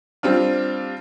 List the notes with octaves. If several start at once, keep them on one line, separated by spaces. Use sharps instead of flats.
G3 C4 D4 F4